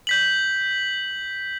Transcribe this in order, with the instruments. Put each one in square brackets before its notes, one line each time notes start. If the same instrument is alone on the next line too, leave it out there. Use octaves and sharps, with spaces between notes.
[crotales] G6 B6 F#7